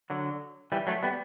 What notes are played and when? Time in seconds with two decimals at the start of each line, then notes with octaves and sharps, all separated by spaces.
0.10 D3 F#3
0.72 E3 G3
0.87 F#3 A3
1.03 G3 B3